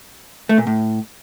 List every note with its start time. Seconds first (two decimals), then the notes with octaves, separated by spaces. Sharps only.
0.49 A3
0.58 A#2
0.67 A2